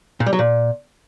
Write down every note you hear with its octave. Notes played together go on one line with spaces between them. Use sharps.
A#2
G3
F#3
A#2